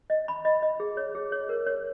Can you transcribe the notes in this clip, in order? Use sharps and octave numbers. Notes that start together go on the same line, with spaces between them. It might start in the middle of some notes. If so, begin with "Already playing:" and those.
D#5
B5
D#5
D#5
G#4
C#5
G#4
C#5
A#4
C#5